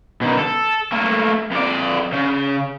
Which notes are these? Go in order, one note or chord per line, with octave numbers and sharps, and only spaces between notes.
B2 D#3
A4
A3 A#3
F2 D5
C#3